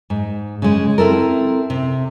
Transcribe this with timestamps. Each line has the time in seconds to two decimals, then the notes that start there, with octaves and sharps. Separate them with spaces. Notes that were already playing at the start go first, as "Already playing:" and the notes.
0.10 G#2
0.62 C#3 G#3
0.98 C4 E4 A4 A#4
1.70 C3